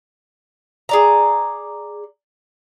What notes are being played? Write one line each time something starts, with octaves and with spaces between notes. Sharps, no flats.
G#4 D5 A#5